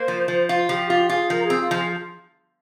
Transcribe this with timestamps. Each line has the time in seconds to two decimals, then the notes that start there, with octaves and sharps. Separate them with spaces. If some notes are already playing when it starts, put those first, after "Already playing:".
Already playing: A#3 C5
0.08 F3
0.28 F3
0.49 F4
0.69 F3 G4
0.90 F4 G4
1.09 F4 G#4
1.30 F3 A#4
1.45 C4 G#4
1.61 F4
1.71 F3 G#4